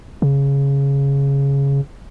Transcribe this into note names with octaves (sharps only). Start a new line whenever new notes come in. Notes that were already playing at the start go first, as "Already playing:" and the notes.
C#3